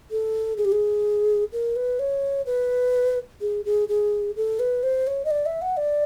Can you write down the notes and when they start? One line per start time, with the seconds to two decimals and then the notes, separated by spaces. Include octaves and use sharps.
0.11 A4
0.57 G#4
0.65 G4
0.72 G#4
1.53 A#4
1.76 B4
1.99 C#5
2.46 B4
3.41 G#4
3.65 G#4
3.89 G#4
4.36 A4
4.59 B4
4.83 C5
5.07 C#5
5.25 D#5
5.31 D5
5.46 E5
5.62 F#5
5.77 D5